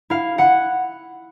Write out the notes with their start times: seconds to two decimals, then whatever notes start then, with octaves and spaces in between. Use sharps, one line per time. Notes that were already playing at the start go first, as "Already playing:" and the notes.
0.10 E4 F5
0.38 E4 F#5